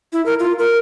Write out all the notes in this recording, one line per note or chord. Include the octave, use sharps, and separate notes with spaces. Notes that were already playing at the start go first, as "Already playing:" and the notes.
E4
A#4
F4
A#4